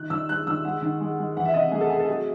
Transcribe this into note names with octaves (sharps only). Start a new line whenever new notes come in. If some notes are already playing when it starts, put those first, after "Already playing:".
Already playing: D#3 F#6
D#3 E6
G#3 F#6
D#3 E6
G#3 F#5
D#3
G#3
G#3
E3 F#5
E5
C3 D#5
A3 G#4
A4
C3 G#4
A4
F#3 G#4